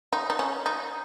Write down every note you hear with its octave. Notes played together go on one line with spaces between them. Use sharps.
D#4
D#4
C#4
D#4